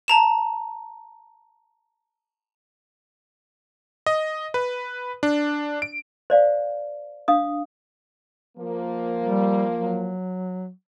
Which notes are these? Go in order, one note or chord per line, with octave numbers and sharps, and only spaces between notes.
A5 A#5 E7
D#5
B4
D4
D7
C5 D5 F5
D4 F5 D#6
F3 A#3
G3
F#3